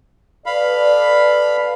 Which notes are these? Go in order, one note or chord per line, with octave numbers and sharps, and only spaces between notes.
A4 B4 D5 F5 B5